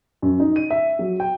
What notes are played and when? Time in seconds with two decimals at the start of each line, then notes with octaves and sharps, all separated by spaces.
0.22 F#2
0.40 D#4
0.56 D#7
0.70 E5
0.99 F#3
1.20 G5